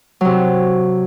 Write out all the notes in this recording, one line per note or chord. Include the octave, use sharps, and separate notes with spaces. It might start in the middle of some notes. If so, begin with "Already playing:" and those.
C3 F#3